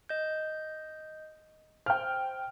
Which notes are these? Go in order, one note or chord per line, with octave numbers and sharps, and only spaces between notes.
D#5 G6
C5 G5 F6